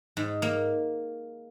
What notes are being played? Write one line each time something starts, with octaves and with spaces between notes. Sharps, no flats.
G#2
A#3